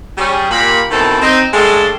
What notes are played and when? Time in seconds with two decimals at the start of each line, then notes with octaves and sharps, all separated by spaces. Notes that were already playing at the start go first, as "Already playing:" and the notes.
0.18 G3 C#4 G#4
0.51 A#2 G4 B5
0.90 B2 D#3 E3 C4 A4
1.22 C4 D#4
1.54 G2 G#3 A3 A4 A5 C6